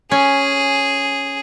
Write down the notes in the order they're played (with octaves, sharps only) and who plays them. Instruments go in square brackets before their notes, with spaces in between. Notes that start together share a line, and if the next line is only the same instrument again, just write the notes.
[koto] C#4 [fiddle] G#4